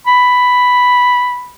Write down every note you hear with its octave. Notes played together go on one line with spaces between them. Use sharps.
B5